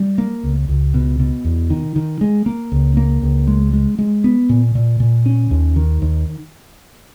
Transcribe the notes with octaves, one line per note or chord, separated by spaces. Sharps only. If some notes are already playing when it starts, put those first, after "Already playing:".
Already playing: G3
A#3
C#2
C#2
B2
B2
E2
D#3
D#3
G#3
A#3
C#2
A#3
C#2
G#3
G#3
G#3
B3
A#2
A#2
A#2
C#4
D#2
D#3
D#2